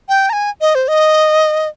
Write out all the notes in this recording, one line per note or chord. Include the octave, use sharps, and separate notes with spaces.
G5
A#5
G#5
D#5
C5
D#5